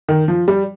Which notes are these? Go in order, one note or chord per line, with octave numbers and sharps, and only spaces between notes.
D#3
F3
G3